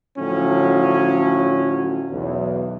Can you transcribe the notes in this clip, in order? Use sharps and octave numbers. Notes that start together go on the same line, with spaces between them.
A2 D3 F3 F#3 C#4
B1 E2